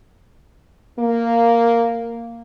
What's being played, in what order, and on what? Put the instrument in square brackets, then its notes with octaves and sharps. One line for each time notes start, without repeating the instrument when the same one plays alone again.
[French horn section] A#3